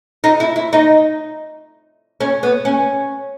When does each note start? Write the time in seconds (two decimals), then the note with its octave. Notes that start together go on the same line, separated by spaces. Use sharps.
0.24 D#4
0.40 E4
0.56 E4
0.73 D#4
2.20 C#4
2.43 B3
2.65 C#4